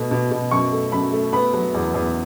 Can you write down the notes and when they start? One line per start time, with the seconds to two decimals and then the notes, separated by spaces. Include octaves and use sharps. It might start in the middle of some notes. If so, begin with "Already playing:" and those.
Already playing: B2 A3
0.11 B2
0.31 B2
0.51 F#2 C#6
0.72 A3
0.92 F#2 B5
1.12 A3
1.33 B3 B5
1.53 F#3
1.74 E2
1.94 E2